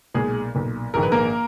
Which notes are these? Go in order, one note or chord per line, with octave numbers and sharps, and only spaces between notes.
B1 A#2 G#3 G#4
B1 A#2
A#1 G#2 D#3 A#4
B4
A#3 A#4